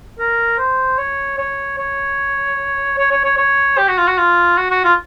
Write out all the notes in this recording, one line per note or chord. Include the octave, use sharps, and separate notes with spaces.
A#4
C5
C#5
C#5
C#5
C#5
C#5
C#5
C#5
G4
F#4
F4
F#4
F4
F#4
F#4
F4